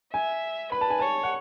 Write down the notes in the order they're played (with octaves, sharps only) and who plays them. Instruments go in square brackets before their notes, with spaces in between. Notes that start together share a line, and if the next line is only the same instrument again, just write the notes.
[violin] E5 [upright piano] G#5
[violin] B4 [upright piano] B5
[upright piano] A5
G#5
[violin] C#5 [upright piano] A5
[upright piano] F#5